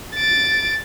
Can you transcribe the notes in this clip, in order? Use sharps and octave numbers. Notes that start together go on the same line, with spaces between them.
A6 D7